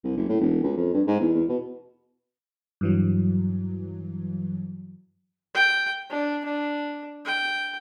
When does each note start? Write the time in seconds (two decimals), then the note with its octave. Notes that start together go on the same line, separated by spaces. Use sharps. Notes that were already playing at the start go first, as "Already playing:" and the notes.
0.04 C2
0.17 F#1
0.29 A2
0.41 E1
0.63 C#2
0.77 F2
0.94 G2
1.07 G#2
1.20 E2
1.34 E2
1.49 B2
2.81 G2 E3 F#3
5.55 G5
6.10 D4
6.45 D4
7.25 G5